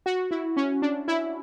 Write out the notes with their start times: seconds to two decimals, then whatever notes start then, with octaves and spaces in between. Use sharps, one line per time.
0.06 F#4
0.31 E4
0.57 C#4
0.82 D4
1.08 E4